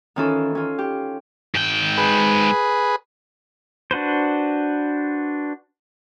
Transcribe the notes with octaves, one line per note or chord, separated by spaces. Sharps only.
D#3 E3 C#4 F4 A4
C#4 F4
G4
G#2 G5
G#4 B4
D4 F#4 B4 C5